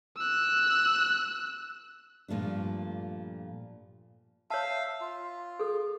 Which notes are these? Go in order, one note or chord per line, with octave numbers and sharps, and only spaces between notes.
E6 F#6
G2 A#2 F3 A3 D4
C#5 E5 F5 A5
F4
G#4 A4